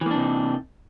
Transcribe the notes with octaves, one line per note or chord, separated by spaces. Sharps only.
C3 E3 A#3 D4 D#4